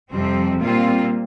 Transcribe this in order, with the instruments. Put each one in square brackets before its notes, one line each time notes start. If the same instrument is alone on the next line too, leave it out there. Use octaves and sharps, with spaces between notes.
[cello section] F2 C3 F3 C4 [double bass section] G3
[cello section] A#2 G3 C4 F4 [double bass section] A#3